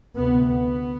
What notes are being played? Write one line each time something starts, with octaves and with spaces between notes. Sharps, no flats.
D2 C3 B3
B3